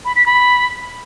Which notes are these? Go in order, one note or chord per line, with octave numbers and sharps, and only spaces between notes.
B5
B6
B5